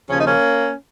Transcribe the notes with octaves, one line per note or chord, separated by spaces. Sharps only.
D#2 C#3 F3 C#4
D#4
A#3 C#4